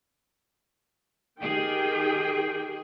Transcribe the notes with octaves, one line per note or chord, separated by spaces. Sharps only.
D#3 G4 G#4 G5